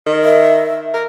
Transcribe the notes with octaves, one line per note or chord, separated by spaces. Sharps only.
D#3
E5
A#4